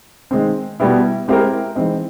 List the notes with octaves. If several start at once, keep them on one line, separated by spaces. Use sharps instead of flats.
D#3 G#3 C4
B2 G3 B3 E4
G#3 C4 E4 G4 A#4
E3 G#3 C4 D#4